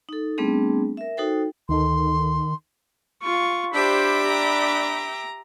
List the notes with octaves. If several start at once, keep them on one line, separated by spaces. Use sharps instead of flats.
D#4 A4
G3 A3 B3 C4 D4 G#4
A#4 E5
D#4 F#4 A4 C5 G5
D2 D#3 D#4 A4 C6
F4 C#6
D4 G4 C5 E5 G5 B5 D6
A#5